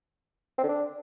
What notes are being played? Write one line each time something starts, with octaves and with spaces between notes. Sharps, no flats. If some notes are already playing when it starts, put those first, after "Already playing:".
C4
D3
D4